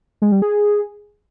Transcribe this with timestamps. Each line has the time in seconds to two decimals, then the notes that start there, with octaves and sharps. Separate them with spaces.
0.22 G#3
0.32 G3
0.42 G#4